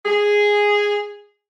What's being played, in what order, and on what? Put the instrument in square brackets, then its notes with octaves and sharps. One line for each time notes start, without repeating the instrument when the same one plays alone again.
[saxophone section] G#4